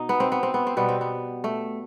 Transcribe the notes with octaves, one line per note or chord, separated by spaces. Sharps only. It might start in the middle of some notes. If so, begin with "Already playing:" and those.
Already playing: B2 D#4
B3
C4
B3
C4
B3
C4
B2 G3 B3
C4
B3
A3